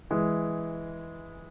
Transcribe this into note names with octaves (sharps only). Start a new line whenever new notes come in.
E3 G#3